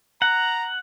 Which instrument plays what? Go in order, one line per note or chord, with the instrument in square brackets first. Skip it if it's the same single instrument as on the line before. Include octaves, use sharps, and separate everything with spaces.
[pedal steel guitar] F#5 [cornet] A#5